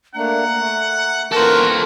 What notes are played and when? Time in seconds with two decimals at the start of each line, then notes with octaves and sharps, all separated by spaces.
0.15 A3 A#3 D4 F#5 A#5
0.59 A3
1.32 D#3 E3 A#3 F#4 A4 A#4 C5